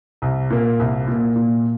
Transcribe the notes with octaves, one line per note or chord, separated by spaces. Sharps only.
C2
A#2 A#3
C2
A#2 A#3
A#2